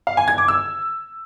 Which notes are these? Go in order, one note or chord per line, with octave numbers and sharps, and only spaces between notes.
F5
G#5
G#6
D6
E6